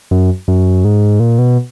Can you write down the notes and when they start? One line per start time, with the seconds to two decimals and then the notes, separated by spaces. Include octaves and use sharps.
0.11 F#2
0.48 F#2
0.85 G#2
1.20 A#2
1.39 B2